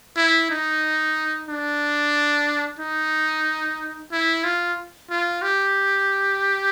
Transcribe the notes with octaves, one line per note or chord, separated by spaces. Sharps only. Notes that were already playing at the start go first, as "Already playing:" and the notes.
E4
D#4
D4
D#4
E4
F4
F4
G4